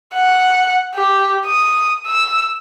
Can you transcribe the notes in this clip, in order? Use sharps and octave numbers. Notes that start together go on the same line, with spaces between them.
F#5
G4
D#6
E6